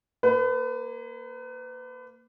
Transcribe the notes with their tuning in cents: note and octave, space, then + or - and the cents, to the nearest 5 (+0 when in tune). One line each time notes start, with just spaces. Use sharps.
A#3 +0 B4 +35